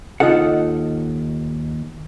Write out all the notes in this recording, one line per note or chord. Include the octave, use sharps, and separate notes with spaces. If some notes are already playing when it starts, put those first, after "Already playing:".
D#2 D#3 D#4 F4 A4 F#5